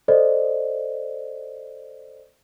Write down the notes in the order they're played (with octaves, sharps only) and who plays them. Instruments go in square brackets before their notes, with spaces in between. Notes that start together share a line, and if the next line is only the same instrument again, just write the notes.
[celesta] A4 C5 D5 D#5